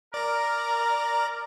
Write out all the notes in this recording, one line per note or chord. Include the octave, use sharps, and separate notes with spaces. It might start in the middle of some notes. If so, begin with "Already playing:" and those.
A#4 D5 A#5